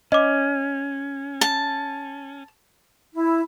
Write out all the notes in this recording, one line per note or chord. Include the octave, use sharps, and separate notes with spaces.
C#4 D#5 D6
A5
E4